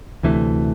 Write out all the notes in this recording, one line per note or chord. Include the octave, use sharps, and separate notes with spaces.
D2 C3 E3 A3